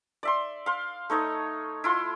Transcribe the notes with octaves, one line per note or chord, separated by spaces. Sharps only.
D5 E5 C6
F5 C6
A3 D#4 C#5 D#5
E4 F4 C6